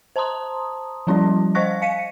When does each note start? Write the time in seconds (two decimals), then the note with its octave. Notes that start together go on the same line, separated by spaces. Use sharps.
0.16 C5 A5 A#5 C6 D#6
1.07 F3 G3 C#4 E4 F#4 D5
1.55 C5 D#5 F5 C#6 F#6 A#6
1.82 F5 B6 C#7 D#7